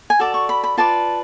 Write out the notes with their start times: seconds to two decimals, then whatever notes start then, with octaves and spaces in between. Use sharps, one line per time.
0.10 G#5
0.19 F#4 A4 D5 A5
0.34 C#6
0.49 B5
0.64 B5
0.77 F4 B4 D5 A5